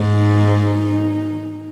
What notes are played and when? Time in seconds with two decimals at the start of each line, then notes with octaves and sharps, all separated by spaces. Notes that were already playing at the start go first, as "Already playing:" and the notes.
Already playing: G#2
0.16 D#4